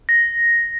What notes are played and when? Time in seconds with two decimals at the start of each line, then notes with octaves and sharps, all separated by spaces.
0.09 A#6